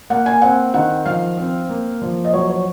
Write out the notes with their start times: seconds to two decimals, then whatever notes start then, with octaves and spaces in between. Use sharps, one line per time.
0.10 A#3 F#5
0.26 G#5
0.42 C4 F#5
0.74 D#3 F#5
1.06 F3 F5
1.37 C4
1.69 A#3
2.02 F3
2.25 D#5
2.33 F#3 C#5
2.49 C#5